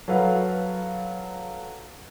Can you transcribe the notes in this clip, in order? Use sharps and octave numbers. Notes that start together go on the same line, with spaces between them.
F#3 A4 B4 F5